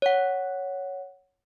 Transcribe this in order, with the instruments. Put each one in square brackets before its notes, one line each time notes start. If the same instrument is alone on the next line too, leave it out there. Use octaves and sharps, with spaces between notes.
[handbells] C#5 F#5